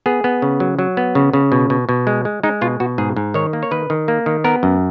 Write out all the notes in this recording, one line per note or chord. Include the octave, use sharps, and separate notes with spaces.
B3 G#4
B3
C#3
F#3
F#3
B3
C#3
C#3
B2
B2
B2
G#3
G#3
G#3 D#4
B2 F4
B2 F#4
G#2 G#4
G#2
D#3 C#5
A#3
C#5
D#3 B4
D#3
A#3
D#3
B3 A#4
F#2